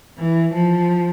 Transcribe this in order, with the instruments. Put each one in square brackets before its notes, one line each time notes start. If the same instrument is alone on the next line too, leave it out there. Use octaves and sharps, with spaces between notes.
[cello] E3
F3